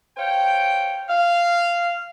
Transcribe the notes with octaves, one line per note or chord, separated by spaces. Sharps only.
C5 C#5 F5 G5
F5